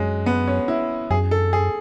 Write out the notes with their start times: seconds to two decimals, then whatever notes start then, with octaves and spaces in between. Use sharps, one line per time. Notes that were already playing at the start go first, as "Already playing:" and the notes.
Already playing: F#2 F#3 G#3
0.26 B3
0.47 C#4
0.68 E4
1.10 F#2 G#4
1.31 A4
1.53 G#4